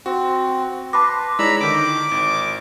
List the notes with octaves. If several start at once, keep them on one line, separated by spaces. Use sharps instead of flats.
C4 F#4
B4 A5 B5 C6 D6 A#6
G#3 D#4 E4 C#5 D5 A#5 B5 E6
D3 D#3 D6
G#1